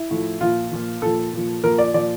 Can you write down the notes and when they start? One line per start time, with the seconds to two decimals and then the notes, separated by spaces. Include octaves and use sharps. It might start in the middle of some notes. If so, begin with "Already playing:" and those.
Already playing: E4
0.11 A2 F3
0.41 A#2 F3 F4
0.72 A#2 F3
1.02 A#2 F3 A4
1.33 A#2 F3
1.64 A#2 F3 A#4
1.78 D5
1.94 A#2 F3 D5